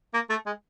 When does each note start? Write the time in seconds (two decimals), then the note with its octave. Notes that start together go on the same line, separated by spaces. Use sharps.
0.14 A#3
0.30 A3
0.46 G#3